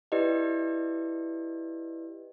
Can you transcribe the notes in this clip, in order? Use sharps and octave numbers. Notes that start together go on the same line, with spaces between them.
E4 G4 B4 D5 D#5